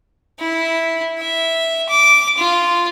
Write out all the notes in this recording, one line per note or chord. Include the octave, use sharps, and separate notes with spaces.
E4
E5
D6
F4